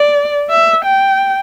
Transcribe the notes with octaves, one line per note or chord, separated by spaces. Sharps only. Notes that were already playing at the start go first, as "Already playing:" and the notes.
Already playing: D5
E5
G5